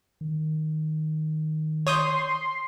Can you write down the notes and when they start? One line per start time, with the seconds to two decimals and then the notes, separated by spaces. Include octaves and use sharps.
0.21 D#3
1.87 C#5 C6 D#6 G6